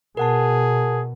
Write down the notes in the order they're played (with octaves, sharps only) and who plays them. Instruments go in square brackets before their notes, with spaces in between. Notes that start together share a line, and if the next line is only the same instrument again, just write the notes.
[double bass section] B2 [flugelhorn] G#4 [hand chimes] A#4 F#5 A5